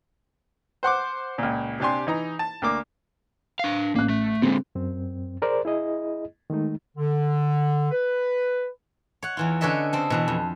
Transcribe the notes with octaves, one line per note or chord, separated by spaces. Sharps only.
C5 F#5 C6 D6
C#2 A#2
C3 D4 G4 G#5 C6
E3 D#4 A#5
A5
D2 A#3 D6
D4 F5
A1 A#3 F#6
A3
D3 G#3 C4
F#2 C4
G#4 A#4 C5 D5
E4 G#4 D#5
D#3 G#3 A3 D#4
D3
B4
C#5 F#5
E2 E3 F4
D3 C#4 B4 C#5 D#5 E5
C#3 C4 A4
B2 E3 E4
F2